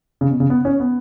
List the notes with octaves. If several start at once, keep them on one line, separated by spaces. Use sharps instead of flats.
C#3
B2
C#3
B3
C#4
B3